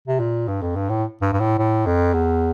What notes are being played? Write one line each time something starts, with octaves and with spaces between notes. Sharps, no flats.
C3
A#2
G2
F2
G2
A2
G2
G2
A2
A2
F2
E2